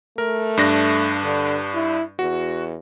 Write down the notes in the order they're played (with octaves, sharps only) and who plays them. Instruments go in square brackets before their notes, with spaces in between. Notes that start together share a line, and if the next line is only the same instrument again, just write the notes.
[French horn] A3 [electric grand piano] A#4
[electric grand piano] G2 D4 A#6
[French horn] D3
E4
[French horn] E2 [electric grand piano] F#4